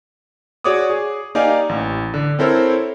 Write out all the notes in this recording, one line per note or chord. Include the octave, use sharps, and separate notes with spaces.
F#4 G#4 C#5 D5 D6 D#6
G#4
A#3 D#4 G4 D5 F5 G#5
A1
D3
C4 E4 A4 A#4 C5 C#5